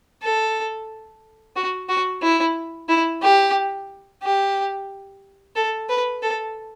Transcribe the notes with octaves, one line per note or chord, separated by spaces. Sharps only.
A4
F#4
F#4
E4
E4
G4
G4
A4
B4
A4